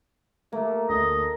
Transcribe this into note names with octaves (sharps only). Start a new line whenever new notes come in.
A3 A#3
D2 A4 D#5